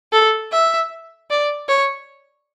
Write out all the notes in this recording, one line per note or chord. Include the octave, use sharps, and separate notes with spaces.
A4
E5
D5
C#5